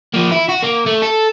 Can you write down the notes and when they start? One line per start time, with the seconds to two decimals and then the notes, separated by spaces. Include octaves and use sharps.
0.14 F3 A#3
0.32 E4
0.49 F#4
0.63 A#3
0.87 A3
1.03 A4